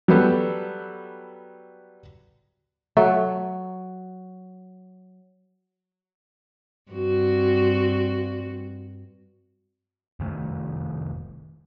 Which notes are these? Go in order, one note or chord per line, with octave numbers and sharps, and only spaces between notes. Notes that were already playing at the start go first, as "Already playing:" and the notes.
F#3 G3 B3 A4
F#3 A3
G2 C4 F#4
F1 D#3 A3